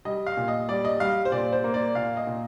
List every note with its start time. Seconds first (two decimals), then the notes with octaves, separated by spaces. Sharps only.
0.05 G3 D#5
0.27 F5
0.37 A#2
0.48 D#5
0.69 G3 D5
0.85 D#5
1.00 G3 F5
1.25 C5
1.32 A#2 D5
1.53 C5
1.64 A#3
1.74 D5
1.95 A#2 F5
2.17 D#5
2.27 A#2